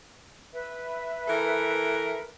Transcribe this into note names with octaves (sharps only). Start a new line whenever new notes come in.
B4 E5
E3 A4 A#4